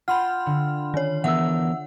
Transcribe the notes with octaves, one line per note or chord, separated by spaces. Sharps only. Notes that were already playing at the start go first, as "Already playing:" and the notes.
F4 F#5 G5 B5 C6 F6
D3
D#3 C#5
E3 B3 A#4 E5 F#5 E6